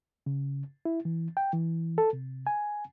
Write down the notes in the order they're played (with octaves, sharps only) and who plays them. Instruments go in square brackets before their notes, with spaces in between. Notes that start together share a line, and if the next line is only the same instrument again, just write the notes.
[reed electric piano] C#3
E4
E3
G5
E3
A4
C3
G#5